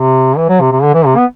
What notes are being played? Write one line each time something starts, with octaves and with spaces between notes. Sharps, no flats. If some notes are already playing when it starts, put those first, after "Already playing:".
Already playing: C3
E3
F#3
C3
C3
D3
E3
C3
B3